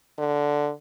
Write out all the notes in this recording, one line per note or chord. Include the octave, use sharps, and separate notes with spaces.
D3